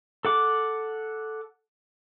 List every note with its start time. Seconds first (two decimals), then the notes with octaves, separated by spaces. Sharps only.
0.25 A4 F#5 D6